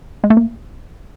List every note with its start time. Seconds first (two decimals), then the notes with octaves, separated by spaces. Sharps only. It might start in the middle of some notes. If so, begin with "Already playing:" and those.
0.24 G#3
0.30 A3
0.37 A#3